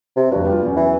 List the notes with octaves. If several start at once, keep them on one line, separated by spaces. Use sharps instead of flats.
C3
F1 G2 F#4
G3 F4
E2 F#3 C#4
E3